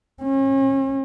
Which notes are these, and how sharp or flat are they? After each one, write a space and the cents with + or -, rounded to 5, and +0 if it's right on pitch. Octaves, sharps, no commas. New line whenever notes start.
C#4 -40